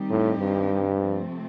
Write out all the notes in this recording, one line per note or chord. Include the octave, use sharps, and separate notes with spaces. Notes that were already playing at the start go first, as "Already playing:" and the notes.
Already playing: D#3 G3 C4 D#4 G4
A2
G2
C3 F3 A3 C4